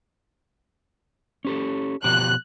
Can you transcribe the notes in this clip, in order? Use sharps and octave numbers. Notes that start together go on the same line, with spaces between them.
C#4 G4 A4
B2 F3 G4 F#6